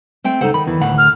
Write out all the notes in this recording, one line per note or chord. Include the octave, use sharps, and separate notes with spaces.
A3 C4 G5
C#2 D#4 A4 C5 F#5
D#3 B5
E2 E3
D2 A2 F#5
F6